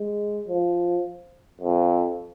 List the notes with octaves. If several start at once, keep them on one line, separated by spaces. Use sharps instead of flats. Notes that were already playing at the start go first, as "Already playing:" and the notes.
Already playing: G#3
F3
F2